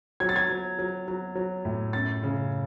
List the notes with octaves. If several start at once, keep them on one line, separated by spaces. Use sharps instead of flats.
F#3 G#6
A6
G#6
F#3
F#3
F#3
F#3
A2
F#2 A6
C#3